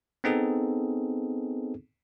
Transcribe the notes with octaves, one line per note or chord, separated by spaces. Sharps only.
B3 C4 D#4 G#4 A4